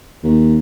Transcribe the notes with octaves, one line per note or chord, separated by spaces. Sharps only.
D#2